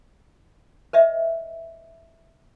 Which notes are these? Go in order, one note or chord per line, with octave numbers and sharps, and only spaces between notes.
B4 D#5 E5